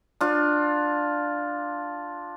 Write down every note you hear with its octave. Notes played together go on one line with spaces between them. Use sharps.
D4 F4